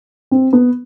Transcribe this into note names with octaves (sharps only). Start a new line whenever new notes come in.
C4
B3